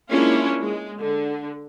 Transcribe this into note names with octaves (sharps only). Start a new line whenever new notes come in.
G#3 A#3 C#4 D4 E4 F4
G#3
D3